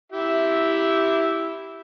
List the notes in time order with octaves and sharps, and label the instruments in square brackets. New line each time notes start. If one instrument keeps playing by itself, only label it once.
[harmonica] E4 G4 E5